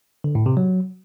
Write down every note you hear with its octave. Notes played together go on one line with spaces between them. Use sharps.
D3
A2
C3
F#3